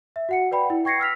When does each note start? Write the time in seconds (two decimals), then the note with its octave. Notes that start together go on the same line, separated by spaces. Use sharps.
0.16 E5
0.29 F#4 F#5 C#7
0.51 B4 D5 G5 B5
0.70 E4
0.85 G5 C#6 G#6 A#6 C7 C#7
1.00 E6 F6 B6 F7